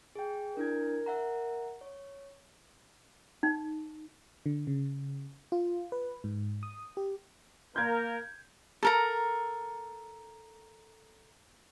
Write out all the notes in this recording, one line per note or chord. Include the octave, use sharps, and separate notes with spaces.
G#4 G5
D4 E4 A#4 G#6
E5 F#5 A#5
C#5
D#4
D3
C#3
F4
B4
G#2
D#6
G4
A#3 A#4 G6 G#6
A4 A#4 A#5